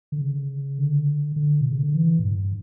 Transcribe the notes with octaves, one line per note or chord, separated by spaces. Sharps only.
D3
C#3
D3
D3
B2
C#3
D3
E3
A2
G2